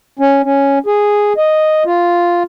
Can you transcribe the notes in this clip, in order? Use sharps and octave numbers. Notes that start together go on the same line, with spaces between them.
C#4
C#4
G#4
D#5
F4